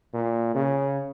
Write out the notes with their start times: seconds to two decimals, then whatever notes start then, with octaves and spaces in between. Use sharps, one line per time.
0.14 A#2
0.55 C#3